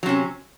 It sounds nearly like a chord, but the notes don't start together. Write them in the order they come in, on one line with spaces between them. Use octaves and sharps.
F#3 C3 C#4